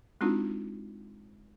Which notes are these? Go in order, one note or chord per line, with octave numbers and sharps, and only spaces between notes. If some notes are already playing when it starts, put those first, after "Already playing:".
G#3 C4 D4 D#4 F4 F#4